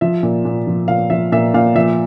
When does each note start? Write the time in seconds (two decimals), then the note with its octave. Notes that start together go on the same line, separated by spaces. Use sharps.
0.01 F3 E5
0.23 A#2
0.45 A#2
0.67 F3
0.88 A#2 F5
1.10 F3 E5
1.32 A#2 E5
1.54 A#2 F5
1.75 F3 E5